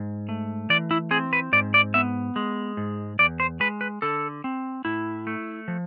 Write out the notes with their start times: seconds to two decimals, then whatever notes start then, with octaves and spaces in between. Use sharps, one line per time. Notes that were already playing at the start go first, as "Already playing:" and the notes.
Already playing: G#2
0.29 A3
0.70 E3 D5
0.91 E4
1.11 C4 G#4
1.33 B4
1.53 G#2 D5
1.74 D5
1.94 B3 E5
2.36 G#3
2.77 G#2
3.19 E2 D5
3.40 C5
3.60 G#3 B4
3.81 B4
4.02 D3 A4
4.44 C4
4.85 A2 E4
5.27 A3
5.68 F3